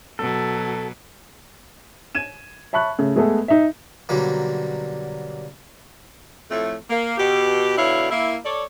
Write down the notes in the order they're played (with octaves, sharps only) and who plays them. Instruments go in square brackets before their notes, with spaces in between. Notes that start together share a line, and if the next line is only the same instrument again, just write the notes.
[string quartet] B2 F#3 [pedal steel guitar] A4
[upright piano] G#6 D#7 E7
E5 A5 B5 C#6 F#6
C#3 A3
G#3 A3 B3 G#4 A4
D#4 E5
[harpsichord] B1 D3 F#3 G3 A#3
[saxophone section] F2 A2 A3
A#3
B2 G4
B2 D3 E4 C#5 F5
A#3 E4
A4 C#5 D5